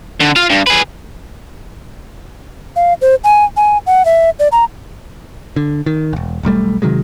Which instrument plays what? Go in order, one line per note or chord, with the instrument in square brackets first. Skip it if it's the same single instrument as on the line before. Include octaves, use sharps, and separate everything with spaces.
[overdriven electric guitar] D3
F4 F5
G2
G#4 B4
[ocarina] F5
C5
G#5
G#5
F#5
E5
D5
A#5
[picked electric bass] D3
D#3
E1 A#1
E1 B1 G3 A3
C3 D#3 F#3 G#3